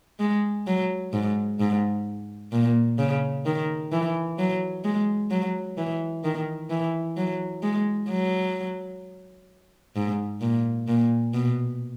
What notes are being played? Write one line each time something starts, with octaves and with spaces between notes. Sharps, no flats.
G#3
F#3
G#2
G#2
A#2
C#3
D#3
E3
F#3
G#3
F#3
E3
D#3
E3
F#3
G#3
F#3
G#2
A#2
A#2
B2